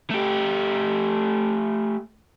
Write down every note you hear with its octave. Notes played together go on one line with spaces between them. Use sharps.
A3 G4